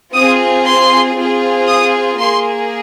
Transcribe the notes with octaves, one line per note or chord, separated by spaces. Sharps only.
C4 F4 G#4 D#6
C6
C4 F4 G#4
D#6
A#3 G#4 C6